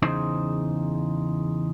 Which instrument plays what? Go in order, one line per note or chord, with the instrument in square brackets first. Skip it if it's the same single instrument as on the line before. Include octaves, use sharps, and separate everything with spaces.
[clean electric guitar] E2 C#3 D#4 C5